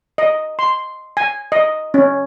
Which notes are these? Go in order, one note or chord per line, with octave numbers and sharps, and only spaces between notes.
D#5
C6
G#5
D#5
C#4